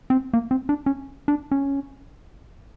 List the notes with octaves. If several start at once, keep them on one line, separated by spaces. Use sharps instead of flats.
C4
A#3
C4
D4
C#4
D4
C#4